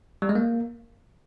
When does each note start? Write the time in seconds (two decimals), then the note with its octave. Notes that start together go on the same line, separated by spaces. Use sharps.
0.22 G3
0.29 G#3
0.35 A#3